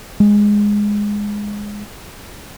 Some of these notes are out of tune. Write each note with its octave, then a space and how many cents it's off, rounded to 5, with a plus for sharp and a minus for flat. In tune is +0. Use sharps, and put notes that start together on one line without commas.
G#3 -5